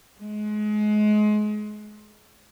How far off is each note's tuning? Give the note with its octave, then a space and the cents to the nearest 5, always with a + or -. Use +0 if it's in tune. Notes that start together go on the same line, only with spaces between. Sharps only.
G#3 +30